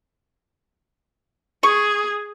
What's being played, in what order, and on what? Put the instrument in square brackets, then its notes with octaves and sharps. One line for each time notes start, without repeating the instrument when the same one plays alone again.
[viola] G#4 [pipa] C#6